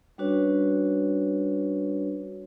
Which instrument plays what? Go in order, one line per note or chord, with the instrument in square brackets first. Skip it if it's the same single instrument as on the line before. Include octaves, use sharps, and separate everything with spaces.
[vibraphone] G3 C#4 D4 F#4 B4 C#5